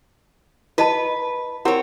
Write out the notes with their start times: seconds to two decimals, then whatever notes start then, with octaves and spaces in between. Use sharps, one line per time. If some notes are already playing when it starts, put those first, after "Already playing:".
0.78 E4 B4 D#5 A5
1.65 C4 E4 A#4 C#5 F#5